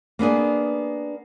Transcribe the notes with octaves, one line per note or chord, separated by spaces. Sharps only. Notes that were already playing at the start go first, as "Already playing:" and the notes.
A#3 B3 D4 G#4